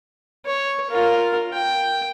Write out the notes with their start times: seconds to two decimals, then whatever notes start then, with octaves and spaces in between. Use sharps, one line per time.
0.45 C#5
0.91 F4 A#4
1.53 G5